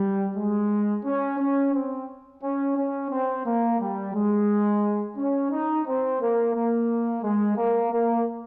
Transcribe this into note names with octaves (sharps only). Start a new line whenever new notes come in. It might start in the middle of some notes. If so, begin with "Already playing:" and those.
Already playing: G3
G#3
C#4
C#4
C4
C#4
C#4
C4
A#3
G3
G#3
C#4
D#4
C4
A#3
A#3
G#3
A#3
A#3